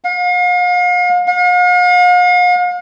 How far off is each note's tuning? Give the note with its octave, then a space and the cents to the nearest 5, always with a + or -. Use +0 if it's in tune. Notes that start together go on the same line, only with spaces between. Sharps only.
F5 +40
F5 +45